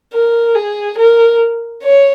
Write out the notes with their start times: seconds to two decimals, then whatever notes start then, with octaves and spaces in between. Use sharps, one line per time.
0.13 A#4
0.55 G#4
0.98 A#4
1.83 C#5